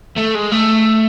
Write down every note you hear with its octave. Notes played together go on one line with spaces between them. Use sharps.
A3
G#3
A3